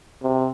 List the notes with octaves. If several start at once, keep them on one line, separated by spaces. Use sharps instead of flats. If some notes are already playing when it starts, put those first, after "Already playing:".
C3